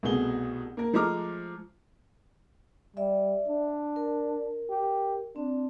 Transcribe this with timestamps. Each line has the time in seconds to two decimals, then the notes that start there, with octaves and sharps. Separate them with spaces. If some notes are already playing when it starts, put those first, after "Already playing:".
0.03 C2 B2 A3 G#4 G7
0.77 A#3 A#4
0.93 F3 G#3 A3 A#5 D6 F6
2.97 G3 D5 E5
3.48 D4
3.96 A#4
4.70 G4
5.36 C4 D4